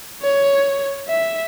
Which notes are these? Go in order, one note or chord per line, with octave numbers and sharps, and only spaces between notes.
C#5
E5